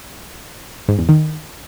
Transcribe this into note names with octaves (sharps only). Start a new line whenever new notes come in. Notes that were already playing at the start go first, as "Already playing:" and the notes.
G#2
E2
D#3